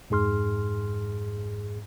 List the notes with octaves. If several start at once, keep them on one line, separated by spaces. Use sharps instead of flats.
F2 G#2 G#4 C6 F6